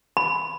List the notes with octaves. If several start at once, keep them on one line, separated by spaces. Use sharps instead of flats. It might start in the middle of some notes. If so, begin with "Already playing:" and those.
B5